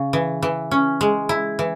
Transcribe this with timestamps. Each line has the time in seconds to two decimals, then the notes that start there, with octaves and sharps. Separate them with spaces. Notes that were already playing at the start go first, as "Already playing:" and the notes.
Already playing: C#3
0.13 E3
0.42 E3
0.71 C#4
1.01 G#3
1.29 E4
1.59 E3